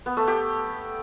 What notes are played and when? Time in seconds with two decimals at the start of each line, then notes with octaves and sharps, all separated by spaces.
0.06 B3
0.17 A3
0.28 G4